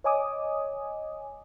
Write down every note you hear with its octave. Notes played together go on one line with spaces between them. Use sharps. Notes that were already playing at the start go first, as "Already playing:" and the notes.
C#5 D#5 G#5 D6 D#6